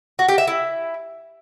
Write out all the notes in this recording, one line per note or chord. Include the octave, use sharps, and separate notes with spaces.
F#4
G4
E5
E4